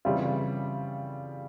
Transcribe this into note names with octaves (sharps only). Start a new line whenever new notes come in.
C#3 E3 G3 C4 F4